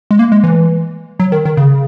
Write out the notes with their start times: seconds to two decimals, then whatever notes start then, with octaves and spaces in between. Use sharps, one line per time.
0.11 G#3
0.19 A#3
0.32 G#3
0.44 E3
1.20 F#3
1.32 D#3
1.45 D#3
1.57 C#3